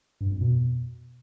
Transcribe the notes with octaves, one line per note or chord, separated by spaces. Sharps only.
G2
F2
B2